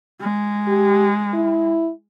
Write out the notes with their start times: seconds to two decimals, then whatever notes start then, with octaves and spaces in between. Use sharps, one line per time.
0.21 G#3
0.68 G4
1.34 E4